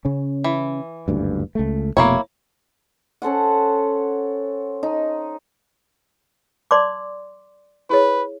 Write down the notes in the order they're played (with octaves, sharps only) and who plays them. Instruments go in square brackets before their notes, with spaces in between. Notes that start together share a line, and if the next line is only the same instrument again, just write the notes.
[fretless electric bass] C#3 C#4
[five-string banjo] E3
[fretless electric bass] F#1 D2 G2
C#2 A3
[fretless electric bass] F1 B2 A3 [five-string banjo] A#3 E4 C#5
[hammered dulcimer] C#4 A4 C5 F#5
D#4
[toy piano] D5 C6 D6 [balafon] A5
[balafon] E4 G#4 C#5 [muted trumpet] B4